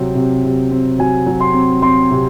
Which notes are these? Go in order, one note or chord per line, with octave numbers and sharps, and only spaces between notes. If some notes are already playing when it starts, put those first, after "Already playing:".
Already playing: C3 F#3 C4
C3
C3
C4
F#3 G#5
F#3
C6
C4
C4 C6
C3